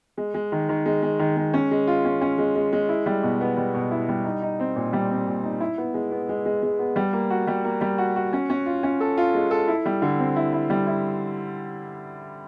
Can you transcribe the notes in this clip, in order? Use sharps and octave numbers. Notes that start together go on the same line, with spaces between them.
G#3
G#3
D#3
D#3
G#3
G#3
D#3
G#3
C#4
G#3
F4
C#4
C#4
G#3
G#3
G#3
E4
G3
B2
B3
G3
B2
E4
G3
D#4
D#4
C4
A#2
G3
C4
A#2
D#4
E4
B3
G#3
B3
G#3
G#3
G#3
B3
G3
A#3
F#4
G3
A#3
G3
F#4
F#4
C#4
C#4
F4
C#4
A4
F4
G#3
A4
E4
G3
D3
C4
E4
E4
G3
E4